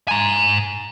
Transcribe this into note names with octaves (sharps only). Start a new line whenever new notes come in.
G#5 A#5